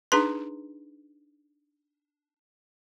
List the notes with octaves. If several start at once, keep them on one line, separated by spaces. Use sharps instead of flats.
D4 D#4 G#4 B4 C6